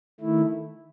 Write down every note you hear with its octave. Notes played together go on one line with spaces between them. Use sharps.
D#3 A3 E4